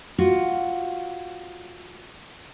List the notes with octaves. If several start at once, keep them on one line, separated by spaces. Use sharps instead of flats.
F4 F#4